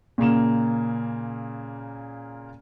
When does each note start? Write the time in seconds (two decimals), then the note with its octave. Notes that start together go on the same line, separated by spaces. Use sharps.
0.18 A#2 C#3 A#3 E7